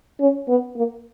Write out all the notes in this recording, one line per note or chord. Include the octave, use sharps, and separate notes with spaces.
C#4
B3
A#3